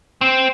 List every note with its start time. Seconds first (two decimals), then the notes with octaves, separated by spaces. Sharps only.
0.21 C4